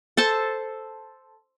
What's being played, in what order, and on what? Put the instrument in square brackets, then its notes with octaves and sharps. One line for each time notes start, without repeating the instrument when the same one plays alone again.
[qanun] A4 C5 A5